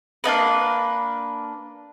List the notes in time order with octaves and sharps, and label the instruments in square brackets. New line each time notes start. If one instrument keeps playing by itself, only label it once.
[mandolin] A#3 D4 D#4 B4